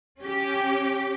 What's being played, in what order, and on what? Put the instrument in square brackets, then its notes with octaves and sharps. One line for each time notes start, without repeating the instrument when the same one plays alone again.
[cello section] C#4 G4